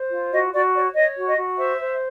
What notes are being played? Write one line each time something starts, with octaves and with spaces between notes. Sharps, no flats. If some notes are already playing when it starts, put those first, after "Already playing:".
Already playing: C5
F4
F#4 D#5
F#4 D5
C#5 D5
C#5 D#5
F#4
D#5
F#4
C5 E5
C5